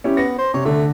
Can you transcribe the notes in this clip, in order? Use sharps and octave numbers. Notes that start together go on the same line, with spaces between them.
C#4 E4 G4
B3 A#6
C5
C3 C#5
D3 A3